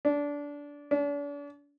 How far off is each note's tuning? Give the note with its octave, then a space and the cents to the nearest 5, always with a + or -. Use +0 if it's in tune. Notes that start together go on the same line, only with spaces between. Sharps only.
D4 -20
D4 -40